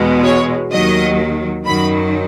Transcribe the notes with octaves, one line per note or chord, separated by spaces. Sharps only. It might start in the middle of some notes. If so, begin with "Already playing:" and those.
Already playing: E2 B2 G#3
C#5
D#2 D#3 F#3 D#5
F#2 D#3 F#3 B5